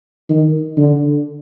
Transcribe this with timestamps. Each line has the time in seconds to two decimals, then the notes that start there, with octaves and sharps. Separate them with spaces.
0.30 D#3
0.77 D3